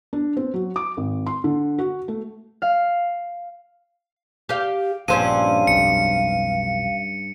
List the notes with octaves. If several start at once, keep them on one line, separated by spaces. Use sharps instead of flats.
D4
C4
F#3
D6
G#1
C6
D3
F#4
A3
F5
G4 F5
A#1 G2 C4 C#4 F5 D#7
B1 F2 C#7